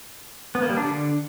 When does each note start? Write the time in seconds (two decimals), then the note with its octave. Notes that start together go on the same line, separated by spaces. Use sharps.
0.55 B3
0.62 A#3
0.70 G3
0.77 D4
0.84 D3